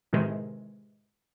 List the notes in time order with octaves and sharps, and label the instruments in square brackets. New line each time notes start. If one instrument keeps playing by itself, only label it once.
[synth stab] A2 C3 D#3 E3 G#3